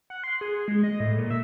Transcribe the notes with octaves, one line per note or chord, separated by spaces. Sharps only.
F#5
C6
G#4
G#3
D#5
A2
A#2
E5